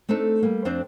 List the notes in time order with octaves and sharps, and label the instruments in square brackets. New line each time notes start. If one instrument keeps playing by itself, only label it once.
[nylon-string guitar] A3 C4 D4 D#4 A4
G3 A#3
F2 C4 D4 C5 D5